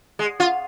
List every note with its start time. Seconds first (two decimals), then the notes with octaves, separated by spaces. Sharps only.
0.19 G#3
0.40 F4